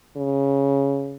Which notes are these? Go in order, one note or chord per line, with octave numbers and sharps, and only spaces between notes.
C#3